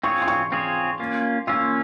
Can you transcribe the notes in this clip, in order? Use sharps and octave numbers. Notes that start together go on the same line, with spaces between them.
C4 F4 G#4 C#5 C#6
C6
C#6
C4 F4 G#4 C#5
A#3 C#4 F4
A#3 C#4 F4 E6